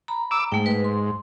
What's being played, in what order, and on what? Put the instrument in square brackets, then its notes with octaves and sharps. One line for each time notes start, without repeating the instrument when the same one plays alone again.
[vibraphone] A#5 B5
[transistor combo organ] D6 E6
[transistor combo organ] G#2 [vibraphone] A3 G5
[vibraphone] B4
C6